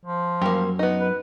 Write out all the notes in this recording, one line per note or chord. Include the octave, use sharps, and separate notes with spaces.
F3
F#2 G3 A#3
B3 D#4
B4